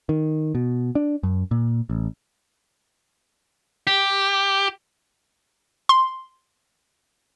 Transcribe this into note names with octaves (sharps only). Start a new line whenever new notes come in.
D#3
B2
D4
F#2
A#2
A1
G4
C6